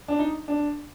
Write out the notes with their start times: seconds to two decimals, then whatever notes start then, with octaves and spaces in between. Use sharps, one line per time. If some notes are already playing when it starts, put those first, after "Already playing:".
0.08 D4
0.19 D#4
0.48 D4